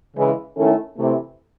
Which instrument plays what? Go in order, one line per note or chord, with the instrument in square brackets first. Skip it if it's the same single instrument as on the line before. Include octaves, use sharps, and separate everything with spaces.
[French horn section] C#3 E3 G#3
D#3 A3 C#4 E4 A4
C3 E3 A3